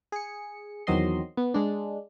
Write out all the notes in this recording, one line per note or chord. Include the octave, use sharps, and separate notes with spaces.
G#4 C#7
E2 D#3 F#3 C4 D#5 C6
B3
G#3 D4